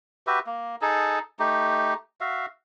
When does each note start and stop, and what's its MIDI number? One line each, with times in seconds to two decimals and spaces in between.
0.27 0.39 66
0.27 0.39 67
0.27 0.39 71
0.27 0.39 76
0.46 0.76 58
0.81 1.19 63
0.81 1.19 68
0.81 1.19 69
1.39 1.94 57
1.39 1.94 63
1.39 1.94 67
2.21 2.46 66
2.21 2.46 76
2.21 2.46 77